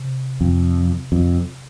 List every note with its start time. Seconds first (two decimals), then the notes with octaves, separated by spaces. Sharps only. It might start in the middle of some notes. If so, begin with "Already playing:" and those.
Already playing: C3
0.41 F2
1.12 F2